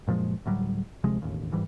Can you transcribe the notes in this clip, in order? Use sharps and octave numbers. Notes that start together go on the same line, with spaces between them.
F#2 A#2 F3 G#3
D2 A2 F#3 G3
D2 C3 F3 G#3
E1 A1 D#2
G1 G#2 E3 G3